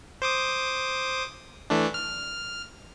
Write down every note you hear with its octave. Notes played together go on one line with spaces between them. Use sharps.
C5 D6 D#6
E3 A3 D4
F6